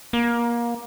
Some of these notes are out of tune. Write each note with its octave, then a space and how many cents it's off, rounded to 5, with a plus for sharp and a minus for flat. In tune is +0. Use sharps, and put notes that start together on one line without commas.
A#3 +25